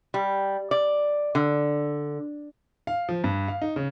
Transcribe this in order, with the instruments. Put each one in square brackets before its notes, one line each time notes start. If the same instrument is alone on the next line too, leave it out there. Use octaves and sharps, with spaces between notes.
[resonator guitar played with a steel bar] G3
D5
D3
[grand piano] F5
F3
G2
F5
D#4
C#3